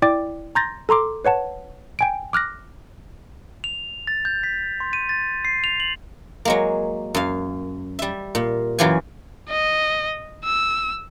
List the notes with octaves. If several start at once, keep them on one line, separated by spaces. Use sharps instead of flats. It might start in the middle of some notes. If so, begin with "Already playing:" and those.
E4 D5 G5 D6 A6
A#5 C6 G6 A6 A#6
A4 A#5 C6 D6
B4 C#5 F#5 A5
G5 G#5 D7
D6 F6 F#6 A#6
F7
A6
G6
B6
C6
D#7
A6
C7
F7
F#7
F#3 G#3 A#3
F#2 F5
G3 E5
A#2
F#2 E3 F#3 F4 G4 G#5
D#5
E6